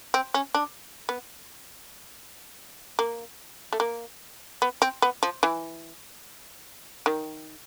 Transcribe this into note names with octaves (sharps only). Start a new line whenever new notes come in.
C4
C#4
D4
B3
A#3
A3
A#3
B3
C4
B3
F3
E3
D#3